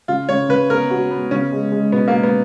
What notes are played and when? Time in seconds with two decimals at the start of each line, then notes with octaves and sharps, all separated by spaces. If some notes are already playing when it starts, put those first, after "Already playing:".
0.08 C#3 F4
0.29 C#3 C#5
0.49 C#3 B4
0.69 B3 A#4
0.90 F#4
1.11 B3
1.31 C#3 C#4
1.52 G#3
1.72 G#3
1.92 B2 B3
2.08 A#3
2.13 B2
2.23 B3